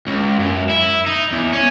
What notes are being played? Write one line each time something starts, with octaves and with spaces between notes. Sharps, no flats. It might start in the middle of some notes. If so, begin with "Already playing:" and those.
C#2
F#2
E4
D#4
E2
C#4